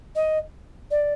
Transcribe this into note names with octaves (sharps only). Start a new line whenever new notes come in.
D#5
D5